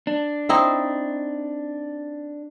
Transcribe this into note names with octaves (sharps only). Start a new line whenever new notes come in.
D4
C4 D#4 E4